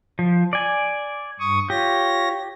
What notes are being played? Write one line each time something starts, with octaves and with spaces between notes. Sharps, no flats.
F3
D5 G#5
G2 C#6 D#6
F4 G4 C#5 A#6